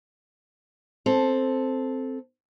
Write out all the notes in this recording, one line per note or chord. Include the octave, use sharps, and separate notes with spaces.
C4 A4